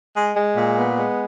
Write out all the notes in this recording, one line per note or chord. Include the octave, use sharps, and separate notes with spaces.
G#3
G#3
A#2
B3
G#3